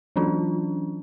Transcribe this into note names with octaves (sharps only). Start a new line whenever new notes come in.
E3 F#3 C#4 D4 F4